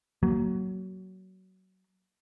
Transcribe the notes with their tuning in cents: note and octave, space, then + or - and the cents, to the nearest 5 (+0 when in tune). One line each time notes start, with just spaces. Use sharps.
F#3 +20 A#3 +0